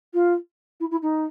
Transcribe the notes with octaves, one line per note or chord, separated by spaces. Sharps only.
F4
E4
E4
D#4